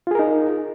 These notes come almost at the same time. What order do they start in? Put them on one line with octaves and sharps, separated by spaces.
F4 G#4 A#4 D#4